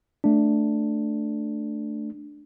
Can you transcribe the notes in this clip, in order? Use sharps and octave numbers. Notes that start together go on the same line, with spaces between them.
A3 D4